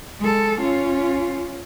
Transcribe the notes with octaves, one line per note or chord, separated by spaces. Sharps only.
G#3 A4
C#4 F4